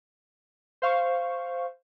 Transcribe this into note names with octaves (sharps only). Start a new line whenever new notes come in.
C5 F5 C#6